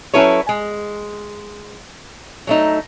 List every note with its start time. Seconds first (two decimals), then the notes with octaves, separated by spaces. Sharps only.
0.14 F#3 C#4 E4 A4 B4 C#5
0.49 G#3
2.47 F#3 A3 D#4